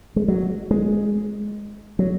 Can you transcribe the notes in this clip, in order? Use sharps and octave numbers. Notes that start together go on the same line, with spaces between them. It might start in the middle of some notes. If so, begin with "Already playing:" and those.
G#3
F#3
G#3
F#3